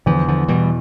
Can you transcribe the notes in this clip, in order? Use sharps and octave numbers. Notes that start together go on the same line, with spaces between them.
E2 D3 F3
D3 F3
B2 E3 G3